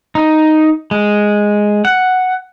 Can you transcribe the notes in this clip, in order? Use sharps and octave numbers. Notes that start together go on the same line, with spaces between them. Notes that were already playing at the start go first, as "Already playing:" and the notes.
D#4
G#3
F#5